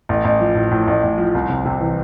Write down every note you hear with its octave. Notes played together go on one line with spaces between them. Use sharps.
A1
A1
F3
A2
A2
A1
A1
F3
C2
C3
C3
E3